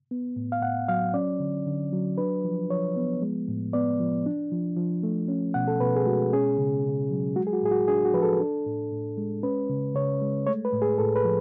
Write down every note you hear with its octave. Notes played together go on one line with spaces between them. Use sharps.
B3
A2
F5
A2 F#5
F#3 F5
C#4 D5
D3
D3
F#3
D4 B4
F3
F3 C#5
B3
G#3
A2
B3 D5
F3
D4
F3
F3
A3
C#4
B2 F#5
A4
B2 B4
G#4
G#3 F#4
C#4 G#4
C#3
C#3
F#3
G#3 F#4
G#4
F#4
A2 G#4
F#4
D4 G#4
F#4
F3 B4
A4
D4
A2
A2
G#3
C#4 B4
C#3
C#3 C#5
G#3
A3 C#5
B4
A2
G#4
A2 A4
B4
F3